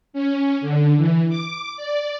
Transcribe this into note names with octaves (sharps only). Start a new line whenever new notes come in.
C#4
D3
E3
D6
D5